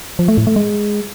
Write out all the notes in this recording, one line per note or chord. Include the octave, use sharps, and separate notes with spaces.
F3
A3
A2
A3
G#3